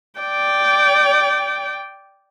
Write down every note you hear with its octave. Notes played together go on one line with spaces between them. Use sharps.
D5 G5